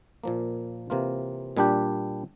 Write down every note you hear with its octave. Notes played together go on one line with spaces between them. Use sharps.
A#2 F3 A#3
C3 E3 A#3 F4
A#2 G3 D4 G4